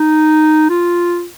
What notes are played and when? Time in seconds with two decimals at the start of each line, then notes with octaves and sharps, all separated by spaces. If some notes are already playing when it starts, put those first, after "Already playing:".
Already playing: D#4
0.70 F4